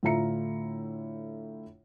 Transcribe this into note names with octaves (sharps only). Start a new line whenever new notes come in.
A2 D3 F4 E5 A#5 C#7